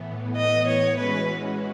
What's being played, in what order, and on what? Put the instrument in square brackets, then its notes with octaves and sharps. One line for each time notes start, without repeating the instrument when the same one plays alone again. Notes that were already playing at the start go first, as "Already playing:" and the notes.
Already playing: [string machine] A2 E3 B3
[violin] D#5
C#5
[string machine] E3 G#3 C#4 F#4 [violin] B4